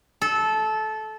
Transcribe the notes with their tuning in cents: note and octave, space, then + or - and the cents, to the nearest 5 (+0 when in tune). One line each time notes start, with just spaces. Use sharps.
A4 -20